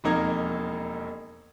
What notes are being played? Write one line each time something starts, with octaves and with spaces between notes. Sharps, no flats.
E1 F2 A#3 D#4 A#5 G#6